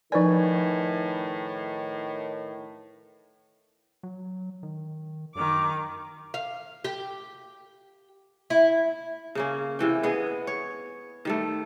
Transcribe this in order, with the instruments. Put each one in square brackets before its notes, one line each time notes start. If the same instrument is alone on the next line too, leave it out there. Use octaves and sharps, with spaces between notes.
[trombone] A2 [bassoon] D#3 [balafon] F3 D5 [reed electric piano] D#4 B4 G#5
[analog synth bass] F#3
D#3
[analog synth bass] F#2 [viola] D#3 D6
[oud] F5
G4
E4
[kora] C#3 A#3 C#4
C3 E3 G5
B3 G#4 D#5
C#5
D#3 G3 A3